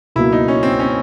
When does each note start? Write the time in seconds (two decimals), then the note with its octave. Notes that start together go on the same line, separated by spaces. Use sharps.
0.16 C#2 B2 F#3 A#3 E4
0.32 D#4
0.48 C#4
0.63 C4
0.80 C#4